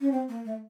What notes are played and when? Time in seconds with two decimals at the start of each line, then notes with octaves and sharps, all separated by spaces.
0.01 C#4
0.12 C4
0.29 A#3
0.45 A3